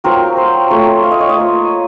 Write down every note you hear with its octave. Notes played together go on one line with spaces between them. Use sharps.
F#3 C4 F4 A#4
C5
A3 C4 F4 C#5
F5
D#5
C#5
D#5
A#3 F4